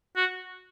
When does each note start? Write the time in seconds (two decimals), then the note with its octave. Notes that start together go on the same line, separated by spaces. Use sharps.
0.16 F#4